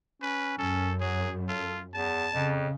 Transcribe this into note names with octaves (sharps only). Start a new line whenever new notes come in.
C#4 B4
F#2 C#4 A4
F#3 G#4
F4 A4
E2 A5
F2 C#3